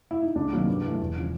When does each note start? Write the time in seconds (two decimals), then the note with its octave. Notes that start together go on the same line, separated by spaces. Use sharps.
0.11 E4
0.23 D#4
0.35 C#2 D4
0.52 C3 D#3 F#3 A#3
0.68 G2
0.83 E3 A3
1.00 E1
1.18 C#3 F3